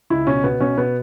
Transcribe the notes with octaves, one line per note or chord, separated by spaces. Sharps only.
C#2 E4
B2 C#4
B2 B3
B2 C#4
B2 B3